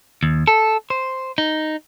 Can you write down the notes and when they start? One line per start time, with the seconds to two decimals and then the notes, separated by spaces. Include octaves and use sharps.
0.23 D#2
0.47 A4
0.90 C5
1.38 D#4